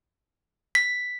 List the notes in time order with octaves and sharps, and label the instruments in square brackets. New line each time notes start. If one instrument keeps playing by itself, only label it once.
[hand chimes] B6